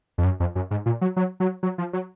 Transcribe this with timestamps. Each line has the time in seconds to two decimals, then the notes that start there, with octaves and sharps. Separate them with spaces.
0.18 F2
0.24 F#2
0.40 F2
0.55 F#2
0.71 G#2
0.86 A#2
1.01 F#3
1.16 F#3
1.40 F#3
1.63 F#3
1.78 F3
1.93 F#3